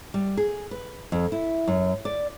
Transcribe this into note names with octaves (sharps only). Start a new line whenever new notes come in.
G3
G#4
B4
F2
E4
F#2
D5